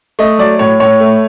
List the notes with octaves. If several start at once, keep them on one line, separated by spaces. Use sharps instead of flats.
A3 D#5
F#3 D5
A2 C#5
A2 C#5
A3